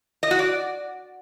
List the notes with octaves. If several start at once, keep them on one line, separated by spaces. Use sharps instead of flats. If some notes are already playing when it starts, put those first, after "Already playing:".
D#5
F#4
D5